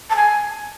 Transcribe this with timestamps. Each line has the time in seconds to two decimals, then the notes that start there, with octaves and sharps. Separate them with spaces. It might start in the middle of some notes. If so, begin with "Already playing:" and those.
0.09 A5
0.15 G#5